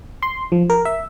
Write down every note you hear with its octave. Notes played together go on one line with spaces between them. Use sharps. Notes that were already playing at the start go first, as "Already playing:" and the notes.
C6
F3
A#4
E5